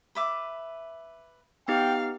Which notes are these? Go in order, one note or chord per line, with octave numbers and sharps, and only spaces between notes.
B4 E5 D6
B3 D#4 G4 F5 G5